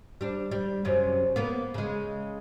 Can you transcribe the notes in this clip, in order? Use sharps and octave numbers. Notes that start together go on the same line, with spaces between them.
G3 D4
G3
F#2 C3 C#4
A#3 B3
C#3 G#3